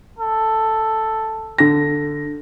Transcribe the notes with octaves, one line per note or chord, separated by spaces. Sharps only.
A4
D3 A#6